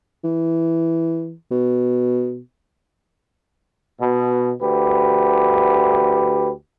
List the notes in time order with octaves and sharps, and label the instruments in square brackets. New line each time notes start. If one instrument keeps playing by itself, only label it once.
[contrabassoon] E3
B2
[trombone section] B2
D2 G4 B4